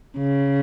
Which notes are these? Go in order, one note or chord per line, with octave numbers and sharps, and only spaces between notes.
C#3